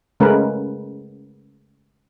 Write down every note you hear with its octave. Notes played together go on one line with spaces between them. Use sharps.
C#3 G#3 A3 C#4 A#4 B4